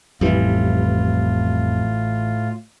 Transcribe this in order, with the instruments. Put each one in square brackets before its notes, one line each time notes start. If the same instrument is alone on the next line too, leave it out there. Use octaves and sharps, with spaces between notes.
[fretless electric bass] A1 E3 [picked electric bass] F2 G3 [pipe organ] A2 F4